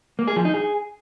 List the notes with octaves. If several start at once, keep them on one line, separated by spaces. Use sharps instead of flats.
A#3
G#4
F3
D#4
G#4